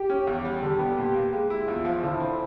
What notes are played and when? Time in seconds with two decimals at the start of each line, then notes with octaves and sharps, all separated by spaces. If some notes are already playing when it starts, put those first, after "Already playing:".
Already playing: G4
0.10 C#4
0.27 E2
0.45 G3
0.62 D3 G4
0.79 B3
0.98 A#2
1.14 A#3
1.33 G#3
1.50 E4
1.67 E2 F4
1.85 F3
2.03 D3 E4
2.20 C4